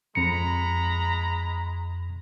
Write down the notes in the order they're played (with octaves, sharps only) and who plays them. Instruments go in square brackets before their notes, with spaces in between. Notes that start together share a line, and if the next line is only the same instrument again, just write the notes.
[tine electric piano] F2 C#7 [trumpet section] G#3 A#5 B5